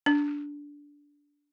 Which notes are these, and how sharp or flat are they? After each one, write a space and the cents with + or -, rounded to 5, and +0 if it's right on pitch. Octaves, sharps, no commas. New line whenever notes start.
D4 -15